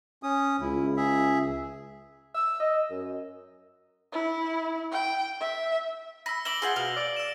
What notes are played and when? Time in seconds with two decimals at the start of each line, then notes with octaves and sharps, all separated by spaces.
0.23 C#4 D#6
0.61 C#2 E4
0.96 G#4 E5
2.34 E6
2.60 D#5
2.90 F#2
4.12 E4
4.91 G5
5.40 E5
6.26 B5 E6 A#6
6.45 E5 D6 F#7 G7
6.62 F4 G#4 C5 F#5
6.76 B2 F5
6.97 D5
7.16 E6 E7